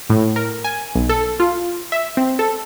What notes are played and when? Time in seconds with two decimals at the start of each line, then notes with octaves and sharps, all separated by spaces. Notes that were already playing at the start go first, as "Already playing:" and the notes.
0.10 A2
0.36 A#4
0.64 G#5
0.95 B1
1.09 A4
1.40 F4
1.92 E5
2.17 C4
2.39 A4